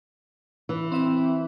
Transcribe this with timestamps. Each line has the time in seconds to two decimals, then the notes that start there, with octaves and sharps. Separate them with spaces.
0.69 E3
0.92 C4 E5